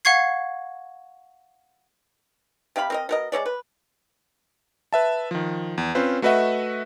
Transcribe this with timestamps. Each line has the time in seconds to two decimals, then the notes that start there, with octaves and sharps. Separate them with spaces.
0.05 F5 F#5 C#6 G#6 C7
2.76 C3 G4 F5 B5
2.90 C4 A#4 D#5
3.09 B2 A#4 D#5
3.32 G#3 C#4 C#5 D5
3.46 B4
4.93 B4 E5 A5
5.31 D#3 F3
5.78 E2
5.95 C4 C#4 F4 B4 C5
6.22 A3 F#4 B4 D#5 E5 F#5